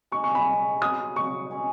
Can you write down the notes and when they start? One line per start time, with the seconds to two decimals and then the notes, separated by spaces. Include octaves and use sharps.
0.11 G#3 D#4 G#4 C#6
0.24 C#6
0.35 B5
0.81 F#3 B3 F#4 D#6
1.16 C#6
1.51 G#3 C#4 G#4